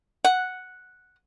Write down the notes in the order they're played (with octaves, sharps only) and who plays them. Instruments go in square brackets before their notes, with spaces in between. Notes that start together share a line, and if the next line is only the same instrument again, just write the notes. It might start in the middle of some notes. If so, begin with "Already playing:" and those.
[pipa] F#5